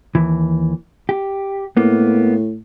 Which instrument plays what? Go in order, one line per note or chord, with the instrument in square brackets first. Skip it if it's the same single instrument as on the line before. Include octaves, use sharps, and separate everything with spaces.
[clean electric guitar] D#2 E3
G4
[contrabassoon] A2 [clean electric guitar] A#3 B3